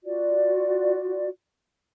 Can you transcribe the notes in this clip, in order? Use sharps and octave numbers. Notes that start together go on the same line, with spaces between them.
F4 F#4 D5